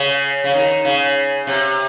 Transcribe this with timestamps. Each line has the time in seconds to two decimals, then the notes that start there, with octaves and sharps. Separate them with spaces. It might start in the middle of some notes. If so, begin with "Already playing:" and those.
Already playing: C#3
0.44 C#3
0.54 D#3
0.85 C#3
1.47 C3